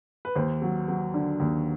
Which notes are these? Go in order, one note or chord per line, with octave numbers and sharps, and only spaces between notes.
B4
D#2 C5
F#3
F#3
D3
D#2